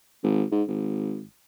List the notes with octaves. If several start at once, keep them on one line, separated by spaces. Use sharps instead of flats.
G#1
G#2
G#1